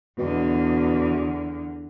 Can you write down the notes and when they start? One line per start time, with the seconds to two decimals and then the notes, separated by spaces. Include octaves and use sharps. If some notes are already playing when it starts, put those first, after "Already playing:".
0.18 E2 B2 D3